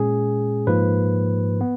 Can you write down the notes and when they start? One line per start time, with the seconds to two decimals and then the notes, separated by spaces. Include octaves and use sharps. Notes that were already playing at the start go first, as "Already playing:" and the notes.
Already playing: A#2 G#3 C#4 G#4
0.67 G#2 F3 A#3 B4
1.61 B3